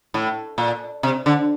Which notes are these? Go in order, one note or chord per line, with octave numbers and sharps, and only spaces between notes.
A2
A#2
C3
D3